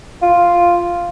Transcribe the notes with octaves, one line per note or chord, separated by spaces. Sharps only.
F4